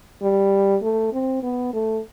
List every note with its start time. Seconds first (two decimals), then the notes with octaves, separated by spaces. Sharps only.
0.22 G3
0.82 A3
1.13 C4
1.43 B3
1.73 A3